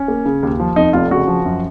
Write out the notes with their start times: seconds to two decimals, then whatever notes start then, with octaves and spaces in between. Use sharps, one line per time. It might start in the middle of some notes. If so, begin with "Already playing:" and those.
Already playing: C#4
0.08 A#3
0.25 C#3
0.43 D#2
0.59 F3
0.76 F2 D#4
0.93 F1 F4
1.11 C#3 F#4
1.28 F3
1.45 F#2